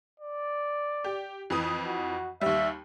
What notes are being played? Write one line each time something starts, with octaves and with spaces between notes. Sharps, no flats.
D5
G4
F2 E3 D#6
F#4
D#2 G3 E5